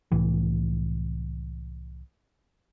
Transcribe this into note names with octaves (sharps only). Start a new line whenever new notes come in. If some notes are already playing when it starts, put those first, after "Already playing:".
C2 A2 E3